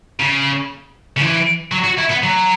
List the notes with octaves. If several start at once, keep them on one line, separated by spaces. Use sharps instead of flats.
C#3
C#3
E3
F#3
F#4
E4
B3
F#3